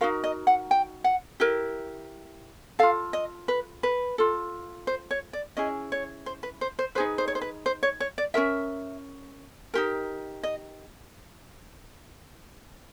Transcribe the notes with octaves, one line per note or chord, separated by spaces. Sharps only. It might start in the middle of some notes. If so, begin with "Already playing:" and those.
D#4 F#4 A#4 F5
D#5
F#5
G5
F#5
E4 G4 A#4
F4 A4 F5
D#5
B4
B4
F4 A4
C5
C#5
D5
C#4 E4 G#4 D#5
C#5
C5
B4
C5
C5
D#4 G#4 B4 C5
C5
C#5
C5
B4
C5
C#5
C#5
D5
C#4 F#4 A#4 E5
D#4 G4 A#4
D#5